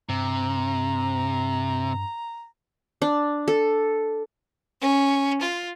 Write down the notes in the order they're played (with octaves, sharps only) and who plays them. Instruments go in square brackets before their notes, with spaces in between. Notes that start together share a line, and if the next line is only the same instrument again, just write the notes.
[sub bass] G2 [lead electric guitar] C3 [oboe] A#5
[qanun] D4
A4
[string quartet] C#4
F4